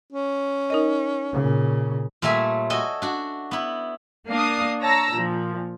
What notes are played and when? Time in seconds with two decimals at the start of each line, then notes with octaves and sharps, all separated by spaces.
0.12 C#4
0.70 D#4 A#4 D#5
1.33 A#2 C#3
2.22 A#2 G3 A3 C#5 E5 G#5
2.70 F#4 A4 D#5 G#5
3.02 D4 F#4
3.51 B3 E4
4.29 A#3 D4 F5 D#6
4.81 C#5 A5 A#5 E6 A#6
5.14 A#2 F3